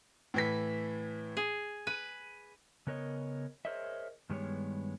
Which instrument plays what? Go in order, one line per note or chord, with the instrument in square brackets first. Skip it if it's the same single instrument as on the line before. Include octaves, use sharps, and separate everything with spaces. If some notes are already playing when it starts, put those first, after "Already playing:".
[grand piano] A2 E3 B6
[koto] G#4
[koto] B4 [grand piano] D#7
[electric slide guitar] C#3 B3 A#4 C#5 D#5
G#4 A#4 C5 C#5 D#5 E5
G2 D#3 G3 G#3 B3 C#5